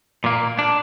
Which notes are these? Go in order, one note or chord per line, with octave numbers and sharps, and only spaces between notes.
A#2 A#3
D4